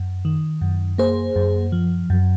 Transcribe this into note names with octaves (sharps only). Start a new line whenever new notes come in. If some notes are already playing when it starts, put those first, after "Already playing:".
Already playing: F#2
D#3
F#2
A#3 G#4 C5
F#2
F3
F#2